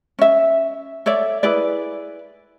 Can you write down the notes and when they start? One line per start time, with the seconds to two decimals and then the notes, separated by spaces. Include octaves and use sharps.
0.19 C#4 E5
1.06 A4 C#5 D5 E5
1.43 E4 G#4 B4 D5